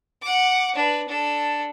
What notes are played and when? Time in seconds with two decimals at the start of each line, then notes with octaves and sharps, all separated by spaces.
0.22 F#5 D6
0.75 D4 B4
1.08 D4 A4